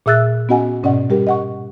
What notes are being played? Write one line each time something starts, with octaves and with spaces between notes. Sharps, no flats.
A#2 G#4 E5 E6 F#6 A6
B3 C#4 F#4 D#5 F#5 G#5
G#2 B2 C#4 D5 D#5 F#5
G3 G4 A#4
D#5 F#5 C#6